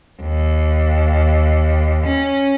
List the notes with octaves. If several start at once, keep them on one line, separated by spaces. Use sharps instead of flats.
D#2
C#4